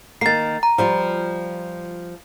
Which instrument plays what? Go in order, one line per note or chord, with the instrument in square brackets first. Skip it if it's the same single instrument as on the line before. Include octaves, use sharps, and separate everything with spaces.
[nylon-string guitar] D#3 A#3 [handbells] A6 C7
[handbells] A#5
[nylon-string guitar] F3 G3 F4